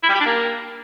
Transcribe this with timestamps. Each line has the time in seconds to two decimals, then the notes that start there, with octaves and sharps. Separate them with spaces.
0.03 E4
0.09 G3
0.15 G4
0.20 D4
0.26 A#3